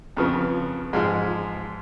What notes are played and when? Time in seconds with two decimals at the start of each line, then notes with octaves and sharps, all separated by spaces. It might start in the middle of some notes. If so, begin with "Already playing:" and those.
0.17 F2 C#3 F3 B3
0.93 G#2 F3 G#3